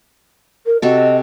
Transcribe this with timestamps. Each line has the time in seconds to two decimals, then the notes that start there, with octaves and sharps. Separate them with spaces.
0.66 A#4
0.82 C3 F#4 A4 D#5